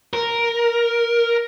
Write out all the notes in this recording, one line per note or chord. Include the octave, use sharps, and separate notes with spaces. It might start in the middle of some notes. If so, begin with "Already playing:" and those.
A#4